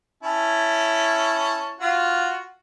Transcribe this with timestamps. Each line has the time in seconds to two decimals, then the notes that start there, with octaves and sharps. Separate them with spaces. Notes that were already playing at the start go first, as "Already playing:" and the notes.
0.23 C#4 E4 A5
1.80 F4 F#4